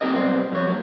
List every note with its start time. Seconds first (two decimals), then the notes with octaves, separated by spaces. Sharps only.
0.01 A#3 C4 F4 G4 A#4 D#5
0.15 B1 G3 B3 C4 C5
0.52 F2 C#5
0.67 F#3 A#3